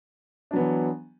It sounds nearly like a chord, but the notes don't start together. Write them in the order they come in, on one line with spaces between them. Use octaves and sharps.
D4 F#3 B3 E3